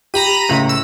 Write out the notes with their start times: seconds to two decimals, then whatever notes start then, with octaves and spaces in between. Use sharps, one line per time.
0.14 G4 A#5 B5 D#7
0.49 C#2 A2
0.69 E6